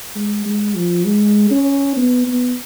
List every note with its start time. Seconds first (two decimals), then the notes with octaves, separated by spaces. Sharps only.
0.15 G#3
0.45 G#3
0.76 F3
1.06 G#3
1.51 C#4
1.97 B3
2.27 B3